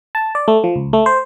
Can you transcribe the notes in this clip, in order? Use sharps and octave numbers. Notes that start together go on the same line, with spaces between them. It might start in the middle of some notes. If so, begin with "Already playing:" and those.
A5
D5
A3
F3
C#2
A3
C5